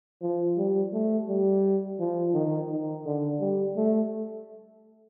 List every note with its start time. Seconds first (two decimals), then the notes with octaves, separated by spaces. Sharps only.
0.22 F3
0.58 G3
0.93 A3
1.28 G3
1.99 F3
2.34 D#3
2.70 D#3
3.06 D3
3.40 G3
3.76 A3